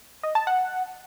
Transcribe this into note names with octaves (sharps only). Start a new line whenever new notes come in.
D#5
A5
F#5